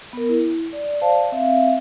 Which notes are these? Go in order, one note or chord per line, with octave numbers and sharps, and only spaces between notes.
B3 A#4
E4
D5
C5 D5 F5 A5
C4 E5 F5